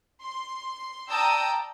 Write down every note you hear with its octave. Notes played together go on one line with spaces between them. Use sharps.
C6
D5 G5 A5 A#5 D#6 E6